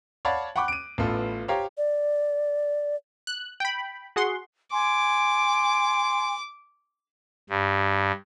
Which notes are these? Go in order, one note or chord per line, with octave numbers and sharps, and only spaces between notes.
C#5 D5 F5 F#5 A5 B5
F#5 G5 B5 C#6 D6 F#6
D7 D#7
A1 A2 B3 F4 A4
G4 C5 C#5 F5 G5 A#5
D5
F#6
G5 B5
F#4 G#4 F#5 C6
G#5 C6 D6
G2